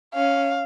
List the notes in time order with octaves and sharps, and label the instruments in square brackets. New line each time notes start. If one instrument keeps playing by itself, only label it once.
[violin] C#4 [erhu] F5